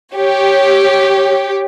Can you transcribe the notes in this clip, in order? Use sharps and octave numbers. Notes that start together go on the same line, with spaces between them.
G4 C#5